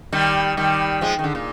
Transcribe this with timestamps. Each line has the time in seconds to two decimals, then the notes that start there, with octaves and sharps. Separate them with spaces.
0.12 D#3 G3
0.57 D#3 G3
1.01 F3 G#3
1.19 D#3
1.24 D3
1.35 A#2